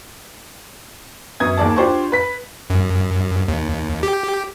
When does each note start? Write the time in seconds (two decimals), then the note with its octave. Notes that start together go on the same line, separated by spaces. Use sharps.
1.40 F#2 B3 D#6 G#6
1.57 D#2 G#4 D5 A5
1.76 D4 F4 G4 C5 D5 C#6
2.12 B4 B6
2.70 F#2
3.48 D#2
4.03 G4